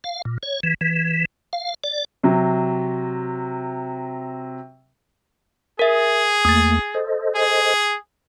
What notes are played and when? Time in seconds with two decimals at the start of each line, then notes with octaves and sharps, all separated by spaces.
0.04 F5
0.25 A#2
0.43 C#5
0.63 E3
0.81 E3
1.53 F5
1.84 D5
2.24 C3 F#3
5.79 G#4 A#4 E5
6.45 E2 A3 A#3 D#6 A6
6.94 A4 C5 D#5
7.35 G#4